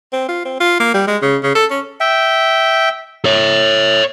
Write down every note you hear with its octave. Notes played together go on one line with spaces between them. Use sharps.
C4
F4
C4
F4
A#3
G3
G#3
C#3
C#3
A4
C#4
E5 G5
C#5 E5